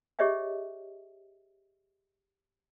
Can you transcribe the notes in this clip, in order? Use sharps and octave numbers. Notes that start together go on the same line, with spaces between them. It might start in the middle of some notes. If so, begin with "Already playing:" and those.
G4 G#4 C#5 D#5 E5 G5